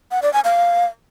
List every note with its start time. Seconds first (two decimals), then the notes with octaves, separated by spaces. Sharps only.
0.11 F#5
0.22 D5
0.33 G#5
0.44 F5